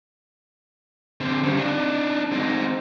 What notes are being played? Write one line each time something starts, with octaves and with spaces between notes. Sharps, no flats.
D3 C4
C#3 G3
D4 D#4
C4 D#4